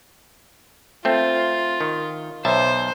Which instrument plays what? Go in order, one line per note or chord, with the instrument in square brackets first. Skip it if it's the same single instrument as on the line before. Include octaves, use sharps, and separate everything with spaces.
[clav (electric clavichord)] A3 C4 [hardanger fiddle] F4
[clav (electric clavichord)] D#3
[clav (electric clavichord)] B1 E5 A5 [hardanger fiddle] C5